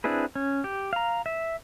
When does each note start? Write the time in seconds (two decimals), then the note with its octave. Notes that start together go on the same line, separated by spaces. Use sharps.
0.04 C4 D4 E4 G#4 B4
0.35 C#4
0.64 G4
0.93 F5 A#5
1.26 E5